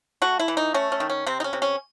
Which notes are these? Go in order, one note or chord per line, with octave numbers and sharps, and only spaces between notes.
A3 F#4
E4
E3
D#4
A3 C#4
C#4
D#3
C#4
C3 C4
D#4
C#4
C3
C#4